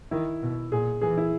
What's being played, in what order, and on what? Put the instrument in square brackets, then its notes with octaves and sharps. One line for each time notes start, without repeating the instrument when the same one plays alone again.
[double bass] D#3 [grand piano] E4
[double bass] B2
[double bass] A#2 [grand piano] G#4
[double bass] E3 [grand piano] G#4
[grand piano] E4